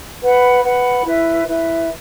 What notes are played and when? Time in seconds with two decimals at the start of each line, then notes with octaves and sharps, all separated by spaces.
0.21 B4 F#5 B5
0.64 B4 F#5 B5
1.05 E4 B4 E5
1.47 E4 B4 E5